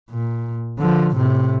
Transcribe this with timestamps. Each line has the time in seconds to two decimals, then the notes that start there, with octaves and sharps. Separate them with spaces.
0.10 A#2
0.79 D3 F3
1.15 A2 C3